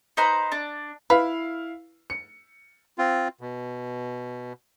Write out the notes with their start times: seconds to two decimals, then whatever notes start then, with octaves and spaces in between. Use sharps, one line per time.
0.17 D#4 B4 C5 A#5
0.52 D4
1.10 E4 B4 F5
2.10 C#7
2.98 C4 F4
3.41 B2